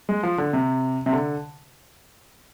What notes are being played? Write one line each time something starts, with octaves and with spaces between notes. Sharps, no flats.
G#3
F3
D3
C3
C3
D3